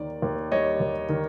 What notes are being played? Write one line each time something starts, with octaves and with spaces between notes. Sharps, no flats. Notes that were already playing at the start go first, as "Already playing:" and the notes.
Already playing: D#2 D#3 D5
D#2
G3 C#5 D#5
D#2
D#3